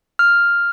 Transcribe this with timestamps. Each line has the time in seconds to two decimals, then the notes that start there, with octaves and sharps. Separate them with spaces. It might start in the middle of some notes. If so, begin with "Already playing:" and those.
0.19 F6